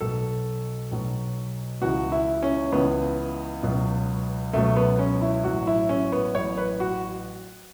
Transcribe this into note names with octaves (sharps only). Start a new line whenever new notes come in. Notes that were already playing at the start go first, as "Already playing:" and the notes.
B1 B2 F#3 A4
B1 B2 F#3
C#2 C#3 E3 F#4
E4
C#4
C#2 C#3 E3 B3
C#2 B2 F#3
C#2 B2 F#3 A3
B3
C#4
E4
A1 A2 F#3 F#4
E4
C#4
B3
A1 A2 F#3 C#5
B4
F#4